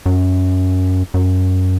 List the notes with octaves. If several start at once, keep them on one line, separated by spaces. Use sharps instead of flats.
F#2
F#2